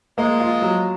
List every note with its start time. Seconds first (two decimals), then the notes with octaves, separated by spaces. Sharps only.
0.18 F3 G#3 A#3
0.40 F4
0.62 F#3